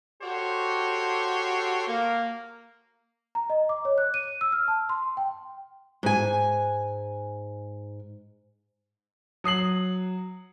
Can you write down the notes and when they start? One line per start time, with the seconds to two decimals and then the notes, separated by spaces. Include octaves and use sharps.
0.22 F#4 G4 A4 C5 C#5
1.88 A#3
3.35 A#5
3.50 D#5
3.69 D6
3.85 C#5
3.98 F#6
4.14 D#7
4.41 E6
4.52 F6
4.68 A5
4.89 C6
5.17 G5
6.03 G#2 G#5
9.44 F#3 D#6 C7 F#7